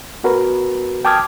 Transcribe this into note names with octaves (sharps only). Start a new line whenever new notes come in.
B3 F#4 A#4 B4
G5 A5 D6 D#6 F6 G#6